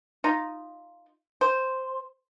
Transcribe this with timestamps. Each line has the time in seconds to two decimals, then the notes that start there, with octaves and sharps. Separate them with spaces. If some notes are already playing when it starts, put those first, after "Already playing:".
0.24 D#4 F4
1.41 C5